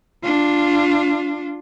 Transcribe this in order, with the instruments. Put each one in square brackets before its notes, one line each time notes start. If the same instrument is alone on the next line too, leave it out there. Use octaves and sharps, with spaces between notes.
[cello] D4 F4